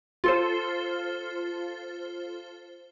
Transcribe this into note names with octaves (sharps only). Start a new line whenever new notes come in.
F4 A4 C5